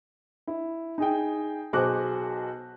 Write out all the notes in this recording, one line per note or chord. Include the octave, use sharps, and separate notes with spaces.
E4
D#4 G#4 G5
B1 F#4 G#4 C5 D6 F#6